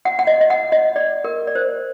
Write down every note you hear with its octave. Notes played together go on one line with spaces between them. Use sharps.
F#5
F#5
D#5
D#5
F#5
D#5
D5
A#4
D5
C5